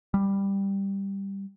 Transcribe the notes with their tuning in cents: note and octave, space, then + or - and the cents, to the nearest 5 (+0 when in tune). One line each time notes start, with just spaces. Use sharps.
G3 +5